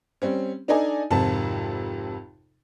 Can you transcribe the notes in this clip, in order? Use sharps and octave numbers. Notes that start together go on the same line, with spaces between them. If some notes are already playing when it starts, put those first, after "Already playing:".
G3 C4 C#4
D4 D#4 A4 D5 D#5 G#5
G#1 F2 C3 A5